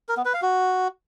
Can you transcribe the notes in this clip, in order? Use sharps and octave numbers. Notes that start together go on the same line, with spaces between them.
A#4
B3
B4
F5
F#4